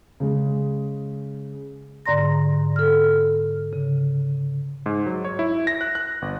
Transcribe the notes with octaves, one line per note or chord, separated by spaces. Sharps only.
C#3 G#3
G#2 D3 D5 A#5 C6 A#6
A4 F6
C#3
G#2
F#3
C#5
E4
A#6
F#6
F#6
G1